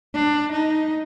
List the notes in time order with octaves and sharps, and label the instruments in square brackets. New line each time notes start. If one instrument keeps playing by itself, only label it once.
[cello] D4
D#4